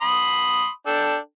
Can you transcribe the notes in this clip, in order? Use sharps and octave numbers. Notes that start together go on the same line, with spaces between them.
B5 C6 D#6
D4 A4 G5